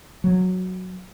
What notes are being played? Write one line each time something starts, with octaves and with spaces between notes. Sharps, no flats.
F#3